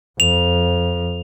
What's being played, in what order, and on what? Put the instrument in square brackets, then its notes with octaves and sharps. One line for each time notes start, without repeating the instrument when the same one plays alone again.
[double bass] F2 [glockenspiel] F7